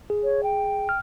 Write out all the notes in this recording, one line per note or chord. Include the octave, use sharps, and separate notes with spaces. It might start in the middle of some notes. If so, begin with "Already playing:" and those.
G#4
C#5
G5
F6